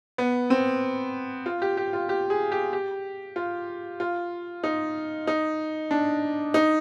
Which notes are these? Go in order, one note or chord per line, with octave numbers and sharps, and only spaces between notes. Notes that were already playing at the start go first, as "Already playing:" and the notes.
B3
C4
F4
G4
G4
F4
G4
G#4
G4
G4
F4
F4
D#4
D#4
D4
D#4